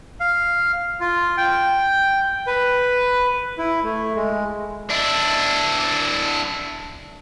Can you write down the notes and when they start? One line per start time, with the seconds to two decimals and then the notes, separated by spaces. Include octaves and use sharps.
0.20 F5
1.00 F4
1.37 G5
2.47 B4
3.58 E4
3.84 A3
4.15 G#3
4.90 D4 E4